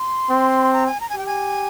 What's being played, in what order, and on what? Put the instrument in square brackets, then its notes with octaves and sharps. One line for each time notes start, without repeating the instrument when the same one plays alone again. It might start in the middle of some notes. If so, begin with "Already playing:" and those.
Already playing: [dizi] C6
[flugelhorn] C4
[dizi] A#5
G#5
A#5
G#5
[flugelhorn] G4 [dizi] G5
[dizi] G#5